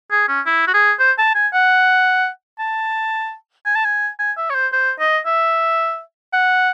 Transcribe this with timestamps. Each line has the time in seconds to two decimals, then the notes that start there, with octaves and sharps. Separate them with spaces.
0.11 G#4
0.28 C#4
0.46 E4
0.67 F#4
0.74 G#4
0.99 C5
1.18 A5
1.35 G#5
1.54 F#5
2.59 A5
3.66 G#5
3.75 A5
3.85 G#5
4.19 G#5
4.37 E5
4.50 C#5
4.55 C5
4.72 C5
4.99 D#5
5.26 E5
6.33 F#5